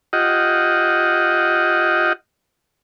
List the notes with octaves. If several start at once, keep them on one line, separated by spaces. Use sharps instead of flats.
F4 G4 D#5 F#5